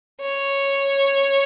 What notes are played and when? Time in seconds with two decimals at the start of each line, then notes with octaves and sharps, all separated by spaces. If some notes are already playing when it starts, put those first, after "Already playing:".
0.21 C#5